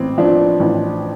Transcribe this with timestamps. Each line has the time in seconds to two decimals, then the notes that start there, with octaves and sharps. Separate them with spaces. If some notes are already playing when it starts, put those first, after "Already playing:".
Already playing: A1 C4
0.18 F3 D4
0.60 A1